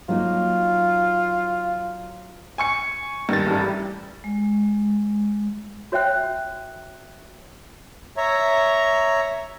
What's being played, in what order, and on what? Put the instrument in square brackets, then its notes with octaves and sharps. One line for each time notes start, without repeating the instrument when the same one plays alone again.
[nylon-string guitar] F#3 A#3 D#4 [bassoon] F4
[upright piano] G#5 C#6 C#7
[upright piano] G2 A6 [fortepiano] D#3
[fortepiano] A1 G3
[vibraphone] G#3
[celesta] F#4 C#5 E5 G5 F#6
[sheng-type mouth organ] C#5 E5 A#5